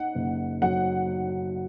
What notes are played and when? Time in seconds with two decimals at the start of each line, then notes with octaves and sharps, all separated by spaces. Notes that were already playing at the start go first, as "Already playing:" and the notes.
Already playing: D#4 F#5
0.15 F#1
0.62 F#3 F#5